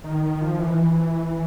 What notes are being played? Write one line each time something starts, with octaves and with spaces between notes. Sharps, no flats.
D#3
D#3
F3
E3